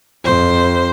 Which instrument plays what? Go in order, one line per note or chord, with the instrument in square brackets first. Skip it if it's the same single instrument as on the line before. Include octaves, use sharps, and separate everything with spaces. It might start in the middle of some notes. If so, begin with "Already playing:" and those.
[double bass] F2 [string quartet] C5